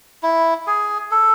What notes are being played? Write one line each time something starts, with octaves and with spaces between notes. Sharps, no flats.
E4
G#4
A4